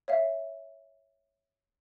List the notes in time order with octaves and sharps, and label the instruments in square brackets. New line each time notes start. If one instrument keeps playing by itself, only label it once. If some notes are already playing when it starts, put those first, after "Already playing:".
[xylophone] C#5 E5 F5